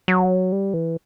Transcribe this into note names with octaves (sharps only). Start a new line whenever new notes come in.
F#3
G3
E3